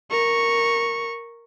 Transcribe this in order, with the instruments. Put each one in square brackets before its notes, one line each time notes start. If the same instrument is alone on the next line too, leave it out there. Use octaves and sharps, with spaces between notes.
[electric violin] A#4 C#6